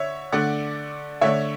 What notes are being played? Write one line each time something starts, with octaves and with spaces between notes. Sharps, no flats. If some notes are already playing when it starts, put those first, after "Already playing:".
Already playing: D3 C#5 E5
D3 A3 D4 D5 F#5
D3 A3 D4 C#5 E5